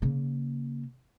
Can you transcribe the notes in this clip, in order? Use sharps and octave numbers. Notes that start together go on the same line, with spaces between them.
C#3 A#3